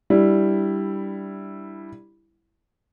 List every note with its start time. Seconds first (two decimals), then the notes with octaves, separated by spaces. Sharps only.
0.10 G3 D4 E4